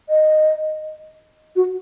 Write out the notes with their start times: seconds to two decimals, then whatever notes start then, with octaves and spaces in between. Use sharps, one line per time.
0.09 D#5
1.56 F#4